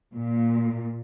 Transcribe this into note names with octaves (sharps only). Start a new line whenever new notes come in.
A#2